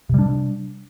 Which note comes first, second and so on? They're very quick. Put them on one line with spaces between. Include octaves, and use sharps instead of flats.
C3 G3 D4